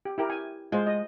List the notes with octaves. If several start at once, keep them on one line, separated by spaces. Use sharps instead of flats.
G4
E4 G4 A#4
G#5
G#3 F4 C5
D#5